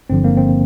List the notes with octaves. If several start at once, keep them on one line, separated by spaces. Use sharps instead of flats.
G1 G2 D3 F3 C4
A#3
C4